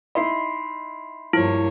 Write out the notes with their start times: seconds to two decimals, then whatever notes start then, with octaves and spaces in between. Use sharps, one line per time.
0.15 D#4 E4 D#5 B5 C6 C7
1.33 G2 F3 A#3 E4 C#5